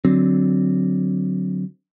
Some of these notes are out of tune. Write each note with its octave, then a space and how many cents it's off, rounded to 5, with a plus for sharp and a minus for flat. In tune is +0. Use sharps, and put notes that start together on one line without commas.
D3 +0 F#3 +0 C4 +0